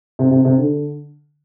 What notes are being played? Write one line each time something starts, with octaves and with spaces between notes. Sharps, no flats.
C3
C3
C3
D3